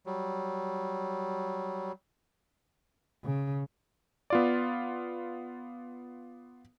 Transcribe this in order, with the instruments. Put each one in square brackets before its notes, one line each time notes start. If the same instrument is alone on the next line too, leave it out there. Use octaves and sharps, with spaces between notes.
[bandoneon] F#3 G3
[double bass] C#3
[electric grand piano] B3 F4 D5